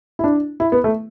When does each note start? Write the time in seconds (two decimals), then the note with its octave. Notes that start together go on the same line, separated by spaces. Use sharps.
0.19 E4
0.24 D4
0.60 E4
0.72 B3
0.84 A3